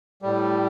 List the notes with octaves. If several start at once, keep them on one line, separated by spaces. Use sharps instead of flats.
A2 G3